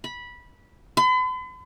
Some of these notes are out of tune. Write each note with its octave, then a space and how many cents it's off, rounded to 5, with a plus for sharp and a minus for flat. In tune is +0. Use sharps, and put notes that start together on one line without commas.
B5 -15
B5 +45